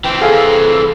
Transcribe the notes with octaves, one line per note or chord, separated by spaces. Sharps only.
E3 C4 G5
G#4 A4 F5